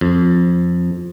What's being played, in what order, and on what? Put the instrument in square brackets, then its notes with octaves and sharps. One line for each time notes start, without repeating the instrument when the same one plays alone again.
[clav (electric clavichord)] F2